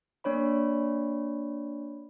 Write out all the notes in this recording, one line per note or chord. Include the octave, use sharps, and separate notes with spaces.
A#3 D4 C#5 D5 B5